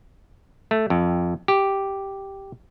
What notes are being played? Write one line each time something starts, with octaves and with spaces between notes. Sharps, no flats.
A3
F2
G4